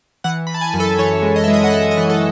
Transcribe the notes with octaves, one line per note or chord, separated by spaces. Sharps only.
E3 F#5
B5
E3
A5
G#5
F#2
A4
E3 C#5
G#3
D#5
E5
G#3
D#5
F#5
G#3 E5
D#5
E3
A4